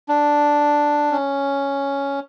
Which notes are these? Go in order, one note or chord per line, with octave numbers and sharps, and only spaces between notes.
D4
C#4